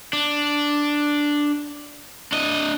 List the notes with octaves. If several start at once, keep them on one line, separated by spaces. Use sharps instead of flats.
D4
D4 D#5